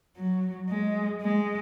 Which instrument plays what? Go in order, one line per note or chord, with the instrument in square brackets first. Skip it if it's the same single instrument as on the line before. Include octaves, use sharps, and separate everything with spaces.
[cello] F#3
G#3
G#3